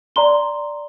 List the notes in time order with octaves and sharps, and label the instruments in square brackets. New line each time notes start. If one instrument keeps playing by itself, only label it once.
[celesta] D5 A#5 C6 G7